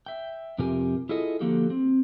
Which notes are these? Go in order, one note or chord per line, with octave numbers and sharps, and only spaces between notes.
E5 G5
F2 C3 F4 G4 A#4 G#5
E4 F4 G#4 A4 D#5
D3 F3 A#3 F#4 G4 A4
C4